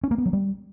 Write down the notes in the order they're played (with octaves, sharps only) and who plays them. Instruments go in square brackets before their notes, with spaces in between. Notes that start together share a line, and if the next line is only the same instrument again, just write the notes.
[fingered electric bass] C#4
A#3
B3
F#3
G3